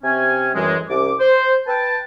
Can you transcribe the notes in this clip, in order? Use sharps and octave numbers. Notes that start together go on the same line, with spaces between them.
C3 C4 C#4 G#5
F#2 A2 E3 G3 G#3
C2 C#4 D6
C5
B4 G5 A5